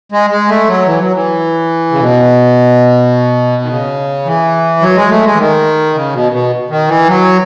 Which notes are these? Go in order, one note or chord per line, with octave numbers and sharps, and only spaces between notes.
G#3
G#3
A3
F#3
E3
F#3
E3
C#3
B2
D#3
C#3
E3
F#3
G#3
A3
G#3
E3
D#3
C#3
B2
B2
D#3
E3
F#3